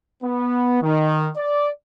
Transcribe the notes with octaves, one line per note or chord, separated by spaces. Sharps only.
B3
D#3
D5